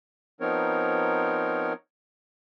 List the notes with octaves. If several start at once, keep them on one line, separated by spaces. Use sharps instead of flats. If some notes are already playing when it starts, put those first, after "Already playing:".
F3 B3 C4 D#4 A#4 C#5